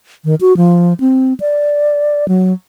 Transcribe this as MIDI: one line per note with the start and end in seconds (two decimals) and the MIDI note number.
0.25 0.35 51
0.41 0.56 66
0.57 0.94 53
1.00 1.34 60
1.40 2.27 74
2.28 2.53 54